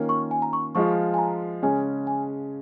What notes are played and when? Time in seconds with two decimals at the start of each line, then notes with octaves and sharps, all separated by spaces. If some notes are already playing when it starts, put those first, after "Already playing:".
Already playing: D#3 A#3 C#4 F4
0.09 C#6
0.31 G#5
0.42 A#5
0.53 C#6
0.75 F3 G#3 F4 C#6
1.14 G#5
1.18 A#5
1.63 C#3 G#3 C#4 G#5
2.07 G#5